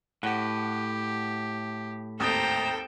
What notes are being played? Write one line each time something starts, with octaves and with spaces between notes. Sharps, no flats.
A2 G4 F#5
G#1 D#2 A4 C5 G5 A#5 D#6